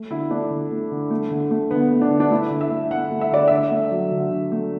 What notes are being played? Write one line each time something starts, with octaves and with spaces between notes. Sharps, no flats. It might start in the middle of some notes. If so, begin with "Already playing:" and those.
Already playing: A3
D3 E4
A3 D4
D3
A3
D3
A3
D3
A3
D3 B3
A3
D4
D3
D4
A3 E4
D3
E5
A3
D3 F#5
A3
E5
D3 D5
D3 E5
A3
F#3
D3
D3
A3